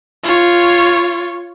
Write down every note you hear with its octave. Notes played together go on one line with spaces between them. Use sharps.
F4 C#5